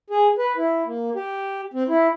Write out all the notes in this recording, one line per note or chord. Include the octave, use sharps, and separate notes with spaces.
G#4
B4
E4
A#3
G4
C4
E4